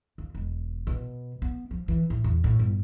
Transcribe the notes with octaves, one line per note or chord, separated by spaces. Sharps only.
D#2
E1
B2
B3
F3
E3
A2
E2
A2
G1